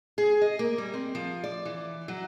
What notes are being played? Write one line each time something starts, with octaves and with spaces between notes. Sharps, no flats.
G#4
D#5
A#3
G3
C4
F3
D5
E3
F#3